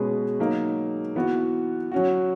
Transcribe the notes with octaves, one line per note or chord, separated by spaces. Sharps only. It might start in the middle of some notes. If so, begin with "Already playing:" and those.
Already playing: B2 G#3 C#4 G#4 B4
F#3 A#3 D#4
E3 B3 F#4
F#3 C#4 F#4